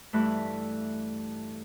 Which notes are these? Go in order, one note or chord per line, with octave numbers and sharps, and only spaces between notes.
G2 E3 A3 E4 B4